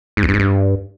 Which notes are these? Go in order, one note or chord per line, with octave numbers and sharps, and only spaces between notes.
G#2
E2
G2
G#2
G2